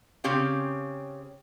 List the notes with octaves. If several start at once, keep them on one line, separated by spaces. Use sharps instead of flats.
C#3 C4 C#4 G4 F5